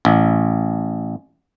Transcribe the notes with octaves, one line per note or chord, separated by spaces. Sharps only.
A1